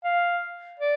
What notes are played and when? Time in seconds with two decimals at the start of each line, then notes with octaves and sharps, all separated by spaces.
0.04 F5
0.79 D5